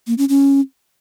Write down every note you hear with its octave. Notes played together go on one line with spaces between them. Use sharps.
A#3
C#4
C#4